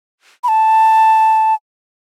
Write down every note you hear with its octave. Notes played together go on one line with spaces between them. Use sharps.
B5
A5